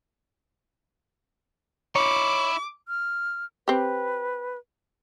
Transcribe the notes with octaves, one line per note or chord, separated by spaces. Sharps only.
D#4 E4 C#5 D6
F6
C4 G4 B4